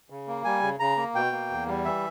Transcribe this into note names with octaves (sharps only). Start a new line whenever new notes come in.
C#3
A#3
G3 G#5
C#3
C#3 A#5
A#3
B2 G5
A#3
E2
G3
E3 E5